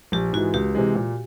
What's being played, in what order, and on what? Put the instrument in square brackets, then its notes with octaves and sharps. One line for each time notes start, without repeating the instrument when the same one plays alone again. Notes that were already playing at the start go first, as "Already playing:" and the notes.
[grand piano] A#1 [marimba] G4
[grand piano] G#2 E3 G#3 [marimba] F#4
[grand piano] C#2 [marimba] G4
[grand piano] C3 E3 G#3
A#2